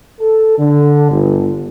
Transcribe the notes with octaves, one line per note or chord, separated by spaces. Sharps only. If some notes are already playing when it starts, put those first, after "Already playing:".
A4
D3
G1